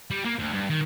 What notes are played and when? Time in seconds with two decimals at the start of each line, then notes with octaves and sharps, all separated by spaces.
0.11 G3
0.25 A#3
0.39 D2
0.54 G2
0.70 D#3